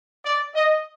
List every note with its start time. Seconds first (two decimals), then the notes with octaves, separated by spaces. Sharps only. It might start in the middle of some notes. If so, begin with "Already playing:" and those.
0.25 D5
0.55 D#5